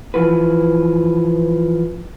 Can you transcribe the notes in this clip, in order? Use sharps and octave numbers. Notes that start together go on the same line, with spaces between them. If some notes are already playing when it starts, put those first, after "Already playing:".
E3 F3 F#4 B4